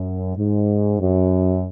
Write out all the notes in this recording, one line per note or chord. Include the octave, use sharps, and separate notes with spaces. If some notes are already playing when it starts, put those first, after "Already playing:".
Already playing: F#2
G#2
F#2